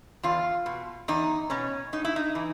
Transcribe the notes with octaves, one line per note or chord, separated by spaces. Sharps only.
E2 F4
B2
E2 D#4
B2 C#4
A2 D#4
E4
D#4
E3